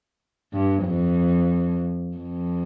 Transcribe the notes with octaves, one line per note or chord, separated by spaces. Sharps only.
G2
F2
F2